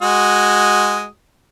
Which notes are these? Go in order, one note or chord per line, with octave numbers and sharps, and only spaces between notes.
G#3 F#4 D#6